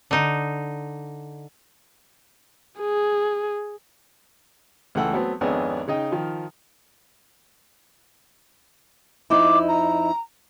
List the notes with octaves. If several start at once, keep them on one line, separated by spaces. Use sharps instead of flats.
D3 D#4
G#4
C#2 E3 A3 F#5 G5 E6
F#3 A3 B3 C4
G#1 F2 B3 C#4 D4 G#4
C#3 D#4 D#5 G5
D#3 F3
F2 D#4 E4 D6
A#5